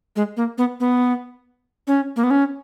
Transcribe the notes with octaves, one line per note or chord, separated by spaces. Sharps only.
G#3
A#3
B3
B3
C#4
A#3
B3
C#4